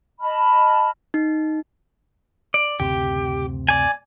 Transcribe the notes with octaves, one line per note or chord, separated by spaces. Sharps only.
D#5 A5 B5 F6
D#4
D5
F#1 D2 C3 G4
D5 G#5